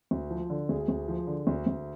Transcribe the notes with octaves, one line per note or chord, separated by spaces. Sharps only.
D2
F3
D3
D2 G#4
D2
F3
D3
D2
D2